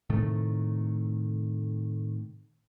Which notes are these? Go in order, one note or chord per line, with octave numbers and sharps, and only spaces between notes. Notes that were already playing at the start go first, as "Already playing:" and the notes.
A2 C3 D#3 A3